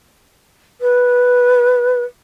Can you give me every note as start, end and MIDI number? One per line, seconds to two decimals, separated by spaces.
0.81 2.03 71